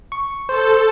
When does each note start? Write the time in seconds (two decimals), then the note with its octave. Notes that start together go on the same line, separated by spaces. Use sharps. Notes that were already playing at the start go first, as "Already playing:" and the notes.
0.12 C#6
0.49 A4 C5